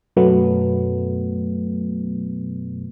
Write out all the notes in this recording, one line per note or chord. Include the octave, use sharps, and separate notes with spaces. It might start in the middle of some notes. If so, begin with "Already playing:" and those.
F#2 B2 F#3 A3 B3